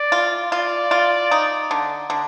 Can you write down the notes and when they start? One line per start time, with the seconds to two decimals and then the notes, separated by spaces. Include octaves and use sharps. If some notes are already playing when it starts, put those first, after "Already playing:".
Already playing: D5
0.12 F4
0.52 F4 D5
0.91 F4
1.31 D#4
1.71 D3
2.10 D3